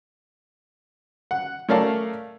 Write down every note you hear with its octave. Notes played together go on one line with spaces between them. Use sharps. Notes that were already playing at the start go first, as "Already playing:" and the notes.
F#5
A3 C#4 A#4 D5 F5 A5